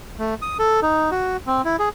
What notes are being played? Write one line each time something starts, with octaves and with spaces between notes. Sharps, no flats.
A3
D#6
A4
D#4
F#4
C4
E4
G#4